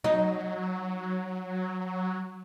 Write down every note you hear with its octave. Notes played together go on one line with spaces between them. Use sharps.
F#3 D#4